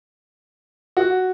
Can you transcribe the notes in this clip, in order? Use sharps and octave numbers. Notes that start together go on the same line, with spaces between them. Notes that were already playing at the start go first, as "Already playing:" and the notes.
F#4